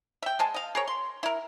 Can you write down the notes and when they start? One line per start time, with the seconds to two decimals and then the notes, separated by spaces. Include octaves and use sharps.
0.22 E5 G5
0.39 G#3 G#5 A5
0.54 D#5 F5
0.75 G#4 A#4 C#5
0.88 C6
1.23 E4 A#4